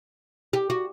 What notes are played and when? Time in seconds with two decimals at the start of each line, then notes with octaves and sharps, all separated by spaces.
0.53 G4
0.70 F#4